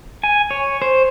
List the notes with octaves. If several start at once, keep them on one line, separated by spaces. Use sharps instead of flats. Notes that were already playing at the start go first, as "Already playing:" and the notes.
G#5
C#5
C5